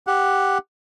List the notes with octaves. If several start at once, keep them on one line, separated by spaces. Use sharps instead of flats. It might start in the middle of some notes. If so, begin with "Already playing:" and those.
G4 F#5